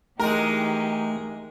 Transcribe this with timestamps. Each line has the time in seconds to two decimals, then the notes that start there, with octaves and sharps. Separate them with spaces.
0.20 E3 G#3 A3 D#4 G4 A#4 A#5